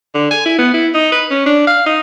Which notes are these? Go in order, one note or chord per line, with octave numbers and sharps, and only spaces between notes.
D3
G#5
E4
B3
E4
D#4
B4
C#4
D4
F5
D#4